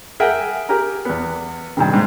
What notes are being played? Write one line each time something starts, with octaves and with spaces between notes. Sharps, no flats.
G#4 A#4 E5 F#5 G5
G4 G#4 A#4 A#5
E2 B3
G2 C3 D#3
G#2